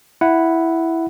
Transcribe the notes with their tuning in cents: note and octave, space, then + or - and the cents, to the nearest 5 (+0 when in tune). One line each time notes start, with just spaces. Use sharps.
E4 +0 F#5 +0